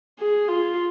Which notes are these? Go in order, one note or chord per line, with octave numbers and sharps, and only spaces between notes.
G#4
F4